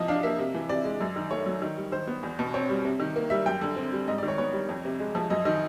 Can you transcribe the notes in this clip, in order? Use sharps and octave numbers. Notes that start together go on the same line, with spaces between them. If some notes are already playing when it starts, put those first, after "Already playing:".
Already playing: C3 E3 F3 D#5
D4 F5
A#3 E5
C3
E3
C3 D5
G#3
F#2
D#3
A3 C#5
F#3
D#3
G3
D#3 C5
B3
E2
B2
C4 C#5
G3
C3
D#3
A#3
G3 E5
F#2 G5
D3
C4
G3
G#2 D#5
D5
D#3
C#5
B3 C#5
G3
F2
C3
G#3
F3
F#2 D#5
D#3 D#5